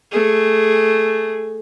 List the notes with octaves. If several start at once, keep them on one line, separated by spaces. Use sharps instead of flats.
A3 G#4